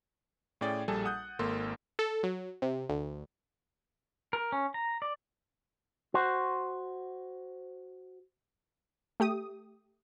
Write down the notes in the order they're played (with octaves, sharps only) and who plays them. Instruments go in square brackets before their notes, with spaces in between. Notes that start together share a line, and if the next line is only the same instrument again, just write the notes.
[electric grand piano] A2 C#4 G#4 D5 G5 A6
A#1 G3 G#4 A4 G#5 A5
F#5 D#6 F#6 G6
G#1 A#3 A4 C6
[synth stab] A4
F#3
C3
D2
[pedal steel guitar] A#4
C#4
A#5
D5
[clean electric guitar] F#4 C5
[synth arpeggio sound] A3 G4 D#6